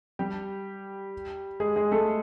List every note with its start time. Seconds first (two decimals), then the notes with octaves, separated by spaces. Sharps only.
0.19 G3 G4
1.60 G#3 G#4
1.76 G#3 G#4
1.91 A3 A4